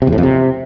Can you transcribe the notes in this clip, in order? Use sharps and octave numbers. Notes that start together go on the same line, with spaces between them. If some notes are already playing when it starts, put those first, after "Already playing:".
C3
E2
A2
F2
C3